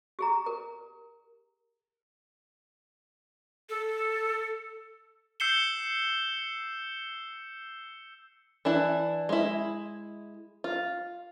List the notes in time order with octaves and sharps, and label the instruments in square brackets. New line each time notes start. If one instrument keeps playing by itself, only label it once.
[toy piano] G4 G#4 A#5
A#4
[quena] A4
[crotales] E6 G6 C7 C#7 E7 G7
[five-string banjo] E3 D4 E4
G#3 E4
F4